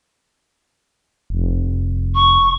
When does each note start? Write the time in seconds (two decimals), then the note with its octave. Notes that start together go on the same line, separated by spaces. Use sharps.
1.30 F1
2.14 C#6